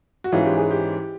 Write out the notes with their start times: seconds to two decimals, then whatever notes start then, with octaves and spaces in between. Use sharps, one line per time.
0.24 F#4
0.32 G#2 E3 G#3 C#4 F4
0.45 G4
0.58 G#4
0.70 G4